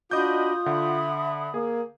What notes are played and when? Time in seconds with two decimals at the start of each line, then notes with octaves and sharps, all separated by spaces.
0.11 D4 F4 F#4 D#5 B5 D6 D#6 G6
0.66 D3 E5 F#5 B5
1.54 A#3 G#4